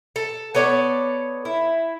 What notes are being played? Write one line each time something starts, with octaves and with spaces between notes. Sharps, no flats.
A4
B3 A4 C#5 D5
E4